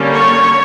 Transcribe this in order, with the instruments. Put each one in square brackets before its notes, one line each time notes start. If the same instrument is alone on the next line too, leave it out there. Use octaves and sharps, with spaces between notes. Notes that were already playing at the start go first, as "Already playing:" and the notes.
Already playing: [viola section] D3 G3 A#3 C#4
C#5